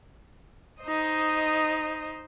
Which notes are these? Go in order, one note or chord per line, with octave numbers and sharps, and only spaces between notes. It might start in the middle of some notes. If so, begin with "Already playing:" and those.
D#4 C5 D#5